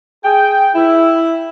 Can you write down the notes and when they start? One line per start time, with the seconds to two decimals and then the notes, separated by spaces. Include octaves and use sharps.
0.25 G#4 G5
0.75 E4